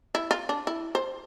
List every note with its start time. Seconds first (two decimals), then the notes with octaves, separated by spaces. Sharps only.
0.15 E4
0.31 F4
0.49 D4
0.67 E4
0.95 C5